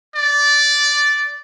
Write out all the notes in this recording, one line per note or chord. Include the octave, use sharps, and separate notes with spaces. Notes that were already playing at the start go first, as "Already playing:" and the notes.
D5